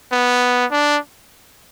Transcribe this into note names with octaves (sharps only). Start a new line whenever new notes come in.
B3
D4